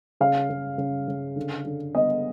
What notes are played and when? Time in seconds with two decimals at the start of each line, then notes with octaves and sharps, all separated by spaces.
0.20 C#3 F5
0.50 C#3
0.78 C#3
1.08 C#3
1.36 D3
1.65 D3
1.95 B3 D#5